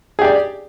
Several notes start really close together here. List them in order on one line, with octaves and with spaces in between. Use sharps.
G#4 G4 D5